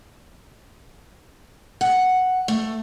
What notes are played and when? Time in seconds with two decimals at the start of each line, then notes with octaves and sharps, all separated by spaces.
1.81 F#5
2.48 A3